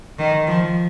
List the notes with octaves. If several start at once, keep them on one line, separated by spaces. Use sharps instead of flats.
D#3
F3